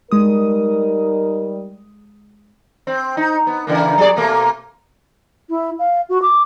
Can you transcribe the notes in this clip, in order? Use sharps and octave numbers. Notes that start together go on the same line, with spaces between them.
G3 G#3 D#4 A#4 D#6
C4
D#4
B3
C#3 E3 A#3
F#3 G#4 D5
B2 A3 A#3
E4
F5
F#4
D6